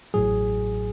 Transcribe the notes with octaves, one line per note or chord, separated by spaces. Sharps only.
A1 A2 F#3 G#4